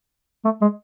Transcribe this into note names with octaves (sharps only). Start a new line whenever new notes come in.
A3
G#3